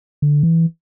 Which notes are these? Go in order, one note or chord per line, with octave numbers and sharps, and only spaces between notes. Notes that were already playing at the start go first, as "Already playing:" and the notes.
D3
E3